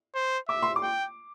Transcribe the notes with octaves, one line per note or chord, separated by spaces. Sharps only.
C5
E5 D6
C6
D6
G5